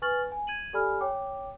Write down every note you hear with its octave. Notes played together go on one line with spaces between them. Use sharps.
B4 G#5 C#6 F6 A6 F#7
G#5
G#6 D#7 F#7
G4 A4 D5 G#5 B5 F6
C#5 G5 D6